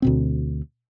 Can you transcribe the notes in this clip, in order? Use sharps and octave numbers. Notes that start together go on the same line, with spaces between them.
D2 B2 C4